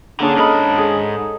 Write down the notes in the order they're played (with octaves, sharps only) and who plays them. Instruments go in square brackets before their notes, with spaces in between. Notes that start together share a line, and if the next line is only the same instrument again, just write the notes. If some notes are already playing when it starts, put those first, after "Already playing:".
[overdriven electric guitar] D3 [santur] A#3 C#4 G#4 [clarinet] D4
[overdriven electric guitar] G#2 B5 [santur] A4 A#4 D#5
[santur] G#4 A4